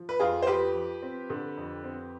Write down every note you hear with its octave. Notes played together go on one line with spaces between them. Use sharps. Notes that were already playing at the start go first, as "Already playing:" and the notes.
Already playing: F3
B4
F2 F4 G#4
C5
F3 G4 B4
F3
C4
D3
F2
C4